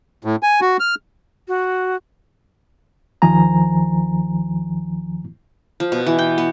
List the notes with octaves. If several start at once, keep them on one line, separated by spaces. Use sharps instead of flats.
A2
G#5
F#4
F6
F#4
D#2 D#3 F3 G#5 A#5
F3
B2
E3
G5
B3